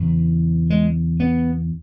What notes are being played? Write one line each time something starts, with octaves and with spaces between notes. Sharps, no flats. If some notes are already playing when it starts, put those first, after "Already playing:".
Already playing: E2 C#3
G#3
B3